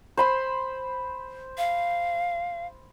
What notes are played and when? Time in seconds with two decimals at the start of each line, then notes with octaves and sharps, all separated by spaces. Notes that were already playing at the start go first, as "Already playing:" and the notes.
0.17 C5 B5 C6
1.58 F5